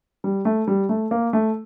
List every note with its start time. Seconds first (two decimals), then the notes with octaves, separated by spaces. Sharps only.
0.24 G3
0.45 A3
0.67 G3
0.89 A3
1.11 A#3
1.33 A3